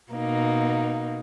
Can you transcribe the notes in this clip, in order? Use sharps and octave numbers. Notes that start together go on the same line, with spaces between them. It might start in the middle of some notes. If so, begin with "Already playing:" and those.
B2 A#3 D#4